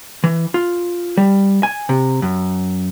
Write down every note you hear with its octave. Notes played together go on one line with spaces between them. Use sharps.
E3
F4
G3
G#5
C3
F#2